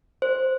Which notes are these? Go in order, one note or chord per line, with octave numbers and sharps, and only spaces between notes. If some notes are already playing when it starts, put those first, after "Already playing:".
C5